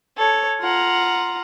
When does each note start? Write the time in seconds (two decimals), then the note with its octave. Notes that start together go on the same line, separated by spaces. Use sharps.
0.17 A4 C#5
0.61 F4 F#5 A#5